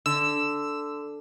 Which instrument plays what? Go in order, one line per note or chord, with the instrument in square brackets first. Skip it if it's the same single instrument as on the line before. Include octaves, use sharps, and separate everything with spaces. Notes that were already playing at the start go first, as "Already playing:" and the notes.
[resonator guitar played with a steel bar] D3 [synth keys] E6